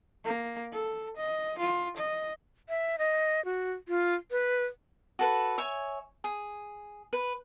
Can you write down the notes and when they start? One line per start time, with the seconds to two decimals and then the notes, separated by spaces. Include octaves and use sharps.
0.25 A#3
0.72 A4
1.17 D#5
1.59 F4
1.97 D#5
2.69 E5
2.99 D#5
3.45 F#4
3.88 F4
4.31 B4
5.19 F#4 A4 B4
5.58 C#5 E5 G#5
6.24 G#4
7.13 B4